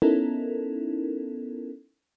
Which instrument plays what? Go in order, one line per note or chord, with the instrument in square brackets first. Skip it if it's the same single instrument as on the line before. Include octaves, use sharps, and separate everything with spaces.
[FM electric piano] B3 C#4 D#4 E4 A4 A#4